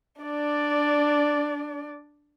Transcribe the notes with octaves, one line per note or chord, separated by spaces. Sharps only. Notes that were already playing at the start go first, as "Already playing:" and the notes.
D4 D5